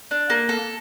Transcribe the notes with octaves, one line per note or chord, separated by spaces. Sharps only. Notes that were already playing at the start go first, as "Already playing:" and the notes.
D4
A#3
A4